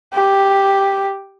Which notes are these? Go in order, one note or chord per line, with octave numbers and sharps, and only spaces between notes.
G4